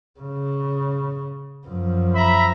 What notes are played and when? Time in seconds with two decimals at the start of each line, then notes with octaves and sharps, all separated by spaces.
0.20 C#3
1.67 F#2 F3
2.15 E5 A#5 B5